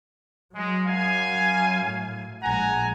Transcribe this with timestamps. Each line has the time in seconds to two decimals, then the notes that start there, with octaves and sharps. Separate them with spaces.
0.55 F#3 G#3
0.87 F#2 F5 G#5
1.85 A2
2.43 A#1 G#3 F#5 G#5 A#5